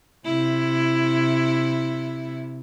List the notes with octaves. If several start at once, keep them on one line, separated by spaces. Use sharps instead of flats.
C3 E4